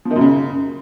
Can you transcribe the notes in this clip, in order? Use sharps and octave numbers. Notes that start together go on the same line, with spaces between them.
F3
D#3
F#2
C#3